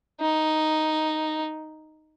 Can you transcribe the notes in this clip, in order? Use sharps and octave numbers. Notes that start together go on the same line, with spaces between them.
D#4